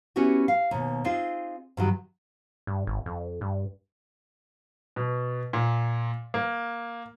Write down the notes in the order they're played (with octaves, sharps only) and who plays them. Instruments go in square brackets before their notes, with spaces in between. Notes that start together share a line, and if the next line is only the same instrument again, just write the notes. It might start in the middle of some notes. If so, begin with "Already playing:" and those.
[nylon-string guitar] B3 C#4 E4 F#4 G4
F5
D#2 B2
C4 D#4 F4 G#4
G2 D#3 F#3
[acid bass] G2
G#1
F2
G2
[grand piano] B2
A#2
A#3